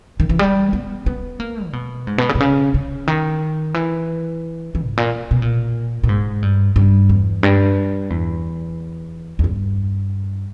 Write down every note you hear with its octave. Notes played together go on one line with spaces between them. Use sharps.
D#3
E3
G3
B3
B3
A#3
C#3
B2
G#2
B2
C#3
B2
C#3
C#3
D#3
E3
E3
G#2
A#2
B2
A#2
A#2
G#2
G2
G2
E2
G2
E2
E2
G2